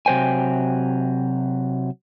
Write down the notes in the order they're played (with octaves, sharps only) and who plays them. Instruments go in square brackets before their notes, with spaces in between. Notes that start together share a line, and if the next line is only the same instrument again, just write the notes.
[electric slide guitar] C3 F#3 C5 G5 G#5